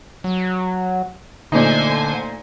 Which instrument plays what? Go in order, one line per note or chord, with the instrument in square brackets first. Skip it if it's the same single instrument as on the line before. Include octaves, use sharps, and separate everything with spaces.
[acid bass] F#3
[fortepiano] A#2 A3 D#4 [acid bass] D3 [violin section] C5 G#5